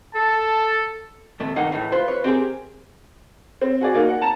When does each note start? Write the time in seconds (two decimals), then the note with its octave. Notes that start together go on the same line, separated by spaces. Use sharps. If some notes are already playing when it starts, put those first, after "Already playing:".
0.15 A4 A5
1.40 D#2 C3 A3
1.56 B1 G2 D#3 A#3 D#4 F#5
1.72 C#2 A2 E3
1.92 F4 B4 C5
2.08 B4 C#5
2.24 C4 G4 G#4 A#4
3.61 C4
3.81 F#4 G#4 D5
3.94 A#3 D#4 F#4 A#4
4.09 F#5
4.21 A5 A#5 E7